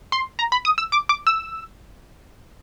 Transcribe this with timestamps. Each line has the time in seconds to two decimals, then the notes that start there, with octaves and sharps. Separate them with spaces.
0.12 C6
0.39 A#5
0.52 B5
0.65 D#6
0.78 E6
0.92 D6
1.09 D6
1.27 E6